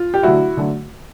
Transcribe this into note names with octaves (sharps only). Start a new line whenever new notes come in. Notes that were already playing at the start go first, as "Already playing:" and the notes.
Already playing: F4
G4
D3 F#3 A3 E4 F#4
D3 F#3 A3